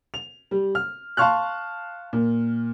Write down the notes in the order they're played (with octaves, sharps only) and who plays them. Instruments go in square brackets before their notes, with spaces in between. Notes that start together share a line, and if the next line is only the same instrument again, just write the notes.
[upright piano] F7
G3
F6
F5 A5 C6 C#6 F6 F#6
A#2